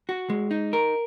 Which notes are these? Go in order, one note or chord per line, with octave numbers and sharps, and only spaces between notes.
F#4
G#3
D#4
A#4